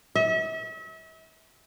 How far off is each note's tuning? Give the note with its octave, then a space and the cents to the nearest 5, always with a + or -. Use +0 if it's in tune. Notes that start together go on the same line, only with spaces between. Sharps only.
E5 -40